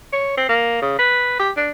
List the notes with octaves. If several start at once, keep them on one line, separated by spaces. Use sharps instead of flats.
C#5
C4
A#3
C#3
B4
G4
D4